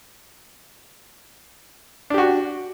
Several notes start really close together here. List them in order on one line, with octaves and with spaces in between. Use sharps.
D4 G4 F#4